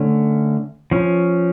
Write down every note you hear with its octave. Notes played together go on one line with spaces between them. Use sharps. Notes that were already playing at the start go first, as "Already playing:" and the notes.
Already playing: D3 A3 C#4
F3 C#4